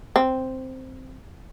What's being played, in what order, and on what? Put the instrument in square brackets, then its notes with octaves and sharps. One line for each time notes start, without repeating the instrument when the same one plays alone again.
[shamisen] C4